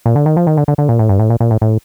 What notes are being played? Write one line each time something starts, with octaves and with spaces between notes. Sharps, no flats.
A#2
D3
D#3
F3
D#3
D3
D3
D3
A#2
A2
G2
A2
A#2
A#2
A2
A2